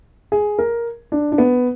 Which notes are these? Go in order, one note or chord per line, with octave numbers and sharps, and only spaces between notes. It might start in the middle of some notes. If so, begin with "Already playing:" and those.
G#4
A#4
D4
D4
B3